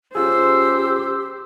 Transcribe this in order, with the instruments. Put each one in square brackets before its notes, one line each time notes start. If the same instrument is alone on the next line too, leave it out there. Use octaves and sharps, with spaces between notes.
[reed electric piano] C#4 F4 G#4 [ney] G4 [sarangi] C5 [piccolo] E6